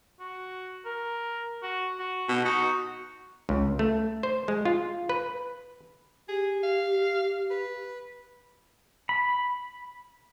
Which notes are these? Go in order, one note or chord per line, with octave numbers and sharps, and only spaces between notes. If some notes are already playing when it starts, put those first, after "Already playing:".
F#4
A#4
F#4
F#4
B2
D#4 F#4
C#2
A3
C5
G#3
F4
B4
G4 G#4
F5
B4
B5